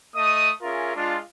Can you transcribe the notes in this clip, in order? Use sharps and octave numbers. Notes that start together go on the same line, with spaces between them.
A3 D#5 D#6
C#4 F4 G#4 A#4 E5
G#3 D4 F4